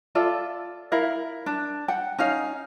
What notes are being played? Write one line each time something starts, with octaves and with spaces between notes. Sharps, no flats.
F4 A4 D5 E5
E4 A#4 F5
D4
F#5 G5
C#4 D#4 F5